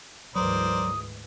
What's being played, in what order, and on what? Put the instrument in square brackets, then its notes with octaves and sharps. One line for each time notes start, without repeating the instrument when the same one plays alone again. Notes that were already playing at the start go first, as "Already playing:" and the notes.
[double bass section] D2 G#2 E3 [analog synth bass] F#3 [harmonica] A#4 C5 D5 [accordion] D#6